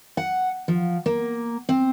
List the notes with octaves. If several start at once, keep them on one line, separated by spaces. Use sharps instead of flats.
F#5
F3
A#3
C4